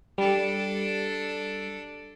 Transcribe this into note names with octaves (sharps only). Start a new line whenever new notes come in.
G3 D4 A4